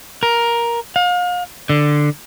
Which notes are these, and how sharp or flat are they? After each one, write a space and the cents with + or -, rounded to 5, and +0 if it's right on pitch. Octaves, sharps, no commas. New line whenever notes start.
A#4 +10
F5 +35
D3 +10